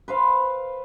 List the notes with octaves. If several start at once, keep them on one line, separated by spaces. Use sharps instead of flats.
B4 C5 F5